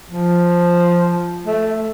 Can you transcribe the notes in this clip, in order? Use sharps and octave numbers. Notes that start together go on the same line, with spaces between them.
F3
A3